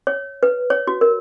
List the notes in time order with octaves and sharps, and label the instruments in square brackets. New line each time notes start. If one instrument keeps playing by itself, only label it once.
[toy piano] C#5
B4
C#5
F#4
A#4